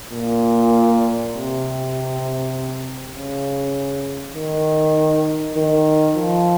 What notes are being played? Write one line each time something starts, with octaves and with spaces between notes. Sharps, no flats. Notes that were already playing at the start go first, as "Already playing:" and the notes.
A#2
C3
C#3
D#3
D#3
F3